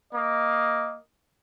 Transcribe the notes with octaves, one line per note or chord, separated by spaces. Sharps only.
A#3 D#5